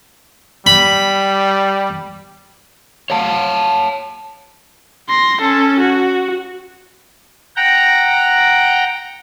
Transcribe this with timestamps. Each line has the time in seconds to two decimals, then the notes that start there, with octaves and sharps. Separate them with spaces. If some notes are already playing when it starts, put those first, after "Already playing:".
0.67 G3 B5
3.10 C#5 F5 A5
5.09 C6 A#6
5.41 C#4 A4
5.80 F#4
7.56 F#5 G5 A#5